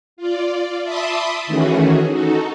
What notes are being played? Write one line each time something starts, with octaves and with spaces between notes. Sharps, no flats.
F4 D5
E5 A5 B5 C6 D6 D#6
D#3 E3 A3 C#4 F#4 G#4
D#4 F#4 A4